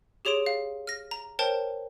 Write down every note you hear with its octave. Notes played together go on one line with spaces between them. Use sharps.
G4 G#4 C#5 C6 D7
F5
F6 A#6
A#5
A#4 C5 C#5 G5 A5